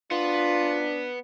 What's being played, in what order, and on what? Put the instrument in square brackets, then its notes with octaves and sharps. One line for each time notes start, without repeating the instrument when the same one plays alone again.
[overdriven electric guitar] B3 [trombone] D4 [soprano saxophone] F4